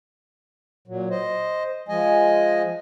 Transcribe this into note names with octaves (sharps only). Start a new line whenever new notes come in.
A#2 F#3
C5 D#5
F3 G#3 D#5 G#5